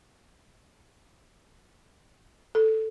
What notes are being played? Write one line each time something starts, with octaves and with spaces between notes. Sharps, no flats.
A4